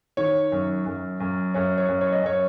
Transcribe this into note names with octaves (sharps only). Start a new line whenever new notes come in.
D#3 C#5
F#2
F#2
F#2
F#2 C#5
C#5
F#2
C#5
D#5
F#2 C#5